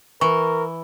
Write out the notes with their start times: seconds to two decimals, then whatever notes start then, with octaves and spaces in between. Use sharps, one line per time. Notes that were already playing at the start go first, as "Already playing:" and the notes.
0.21 E3 A#4 C#6